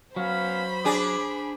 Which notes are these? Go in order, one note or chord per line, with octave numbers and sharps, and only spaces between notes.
F#3 B3 C#4 C5 F5 B5
D4 G#4 D6